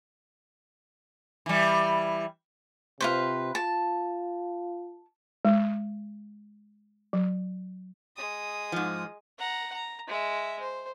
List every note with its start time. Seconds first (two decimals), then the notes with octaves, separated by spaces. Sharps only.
1.46 E3 G3
3.00 C3 F4 B4 C5
3.55 F4 A5
5.45 G#3
7.13 F#3
8.16 G#3 D#6
8.72 G#2 F3
9.39 F#5 A#5
9.74 A#5
10.08 G#3 E5
10.60 C5